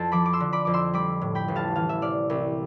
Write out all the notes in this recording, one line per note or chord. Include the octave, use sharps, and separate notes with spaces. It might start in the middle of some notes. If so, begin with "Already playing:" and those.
Already playing: F2 A5
F3 B5 D6
D6
C6 E6
D3
B5 D6
F2 D6
C6 E6
G3 B5 D6
A2
G5 B5
A1
F5 A5
E3 F5
E5
C3 D5 F5
C2